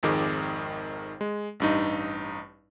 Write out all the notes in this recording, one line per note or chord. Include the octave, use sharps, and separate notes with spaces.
G#1 F2 D#3 G#4 D6
G#3
A1 G2 D#4